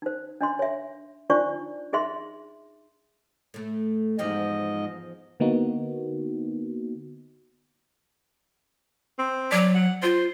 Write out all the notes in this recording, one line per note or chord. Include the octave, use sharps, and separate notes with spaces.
D#4 C5
D4 D#5 C6
C#5 E5
D4 D#4 F4 C5 D5 C#6
D#4 G#4 D#5 E5 C6
A2 A3
E2 G#2 F3 G4 D#5
D3 A#3 B3 D#4 F#4
C4
F#3 D5
F#5
F4 C5